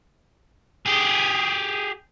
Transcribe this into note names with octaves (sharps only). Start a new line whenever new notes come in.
G4 G#4